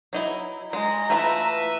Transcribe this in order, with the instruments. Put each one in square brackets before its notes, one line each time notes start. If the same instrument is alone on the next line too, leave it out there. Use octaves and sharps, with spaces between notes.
[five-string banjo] F#3 D#4 E4
[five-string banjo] G#3 [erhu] A#5
[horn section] E3 B4 E5 [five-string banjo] A3 E4 F4